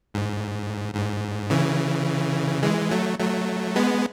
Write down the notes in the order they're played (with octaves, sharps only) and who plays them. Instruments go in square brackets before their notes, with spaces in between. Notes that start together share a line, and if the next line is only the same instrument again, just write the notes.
[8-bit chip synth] G#2
G#2
C#3 E3
E3 G#3
F#3 A3
F#3 A3
G#3 B3